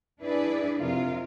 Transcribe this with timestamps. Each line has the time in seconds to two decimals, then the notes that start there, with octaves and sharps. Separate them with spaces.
0.21 D4 E4 G#4 B4 D5
0.80 F2 C3 F4 A#4 F5